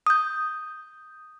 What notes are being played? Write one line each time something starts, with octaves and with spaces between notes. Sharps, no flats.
D#6 G6